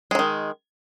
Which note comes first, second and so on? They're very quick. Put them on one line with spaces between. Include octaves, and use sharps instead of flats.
G#3 F#3 D#3